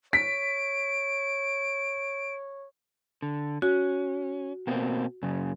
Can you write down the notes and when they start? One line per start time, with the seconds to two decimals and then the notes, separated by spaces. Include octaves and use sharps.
0.13 C#5 B6 D7
3.22 D3
3.62 C#4 F#4
4.67 B2 A#3 C4
5.23 F#2 C#3